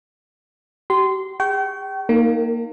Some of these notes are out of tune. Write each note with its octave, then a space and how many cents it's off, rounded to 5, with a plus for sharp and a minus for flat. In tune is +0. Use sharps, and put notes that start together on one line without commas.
G4 -40 C6 -15
G#4 -40 G5 -35 C#6 +0
A#3 +0 D#4 +5 A#4 -35